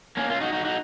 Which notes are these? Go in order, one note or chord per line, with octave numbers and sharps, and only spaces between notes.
A#3 C#4
C#4 F4
D#4 F#4
D#4 F#4
D#4 F#4